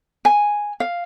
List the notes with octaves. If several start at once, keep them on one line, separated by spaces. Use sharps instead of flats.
G#5
F5